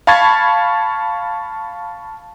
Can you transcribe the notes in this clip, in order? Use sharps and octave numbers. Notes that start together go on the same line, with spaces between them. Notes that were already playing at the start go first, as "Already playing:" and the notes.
F5 A5 B5 C#6 G#6 A6